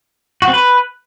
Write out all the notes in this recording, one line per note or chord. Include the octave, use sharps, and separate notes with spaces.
F#4
C4
B4